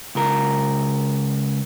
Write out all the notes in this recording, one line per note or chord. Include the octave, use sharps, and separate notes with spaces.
C#2 A#4